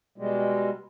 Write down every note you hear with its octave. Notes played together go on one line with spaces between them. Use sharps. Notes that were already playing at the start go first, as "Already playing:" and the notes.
B2 G3 G#3